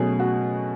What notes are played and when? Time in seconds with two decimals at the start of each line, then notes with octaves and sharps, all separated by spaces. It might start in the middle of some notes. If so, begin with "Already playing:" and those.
Already playing: B2 F#3 A3 C#4 G#4
0.20 F#4